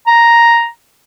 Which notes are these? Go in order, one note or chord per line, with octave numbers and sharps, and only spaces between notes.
A#5